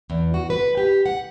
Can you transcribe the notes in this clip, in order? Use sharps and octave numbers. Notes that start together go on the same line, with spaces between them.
E2
F#4
B4
G4
F#5